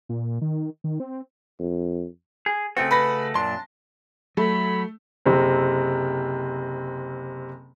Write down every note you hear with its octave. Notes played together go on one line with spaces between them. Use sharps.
A#2
D#3
D#3
C4
F2
G#4
C#3 A3 C4 F#4
B4 B5 A#6
F#2 A#2 D4 A5 C6
F#3 A3 B5
F#1 C3 C4